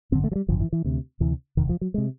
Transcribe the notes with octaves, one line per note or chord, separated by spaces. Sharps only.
G#1 F#2 D3 C4
A3
F#3
G3
G#1 F#2 D3 F3
E3
E3
D2 C3
D2 C3 E3
F1 E2 C3 D#3
F3
F#3
C3 G#3